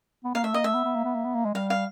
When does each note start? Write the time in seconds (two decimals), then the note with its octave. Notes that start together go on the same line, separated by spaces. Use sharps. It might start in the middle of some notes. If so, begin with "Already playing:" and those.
0.24 B3
0.35 A#3 F5
0.44 A3 E5
0.54 A#3 D#5
0.64 A3 E5
0.74 B3
0.85 B3
0.95 A#3
1.05 B3
1.15 A#3
1.25 B3
1.35 A#3
1.45 G#3
1.54 G3 F5
1.70 F5